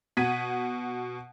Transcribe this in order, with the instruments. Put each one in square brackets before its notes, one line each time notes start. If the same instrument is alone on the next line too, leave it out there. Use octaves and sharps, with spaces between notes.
[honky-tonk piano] B2 F#5 G#6 B6 D#7